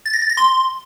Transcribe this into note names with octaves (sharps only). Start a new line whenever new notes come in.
A6
A#6
A6
A#6
C6